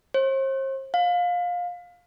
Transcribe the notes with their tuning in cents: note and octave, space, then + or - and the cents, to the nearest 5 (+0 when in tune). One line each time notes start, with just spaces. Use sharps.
C5 +40
F5 +20